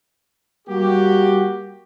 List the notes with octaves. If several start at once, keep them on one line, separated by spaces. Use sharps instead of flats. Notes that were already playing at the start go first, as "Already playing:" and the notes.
G3 A#3 F#4 G4